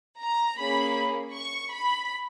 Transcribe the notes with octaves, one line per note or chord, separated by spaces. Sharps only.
A#5
A#3 C#4 G#4 B5
C#6
B5